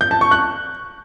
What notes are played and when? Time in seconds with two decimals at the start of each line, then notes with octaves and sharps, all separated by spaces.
0.01 G6
0.11 A5
0.21 C#6
0.31 F#6